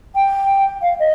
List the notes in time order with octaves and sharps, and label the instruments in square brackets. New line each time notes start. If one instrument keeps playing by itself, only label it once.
[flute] G5
F5
D#5